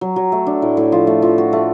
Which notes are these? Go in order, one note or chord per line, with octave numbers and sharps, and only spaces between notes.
F#3
F#3
A3
D4
A2
A2
F3
A3
F3
F#4
A3